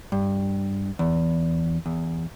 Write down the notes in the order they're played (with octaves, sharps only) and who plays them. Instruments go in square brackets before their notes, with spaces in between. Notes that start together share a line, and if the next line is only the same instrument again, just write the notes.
[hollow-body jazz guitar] G2
E2
E2